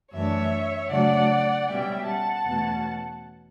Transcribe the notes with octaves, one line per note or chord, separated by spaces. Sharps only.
F#2 E3 A3 D4 C#5 E5
C#3 F#3 A3 D4 D5 F#5
B2 G3 C#4 E5 G5
F#5 A5
E2 B2 A3 C#4